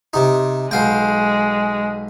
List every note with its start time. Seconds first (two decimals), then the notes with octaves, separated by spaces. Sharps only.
0.13 C3 D#4
0.71 B1 G#3 F5 G5